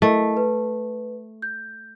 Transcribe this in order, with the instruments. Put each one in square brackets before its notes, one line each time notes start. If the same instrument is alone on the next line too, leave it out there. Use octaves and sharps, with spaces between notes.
[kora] A3 [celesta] E4 A#4 D#5
[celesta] B4
G6